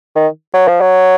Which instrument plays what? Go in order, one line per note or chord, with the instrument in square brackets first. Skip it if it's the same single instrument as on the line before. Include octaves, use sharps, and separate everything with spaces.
[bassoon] D#3
F#3
F3
F#3